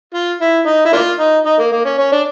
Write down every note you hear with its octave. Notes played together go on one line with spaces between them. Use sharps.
F4
E4
D#4
E4
A#3 D4 F4
D#4
D#4
A#3
A#3
C#4
C#4
D4